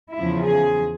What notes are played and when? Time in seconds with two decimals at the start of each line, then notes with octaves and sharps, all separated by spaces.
0.15 E2 C#3 F3 E4
0.47 G#4